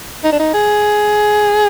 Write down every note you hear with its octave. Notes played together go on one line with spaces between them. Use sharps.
D#4
D4
D#4
G#4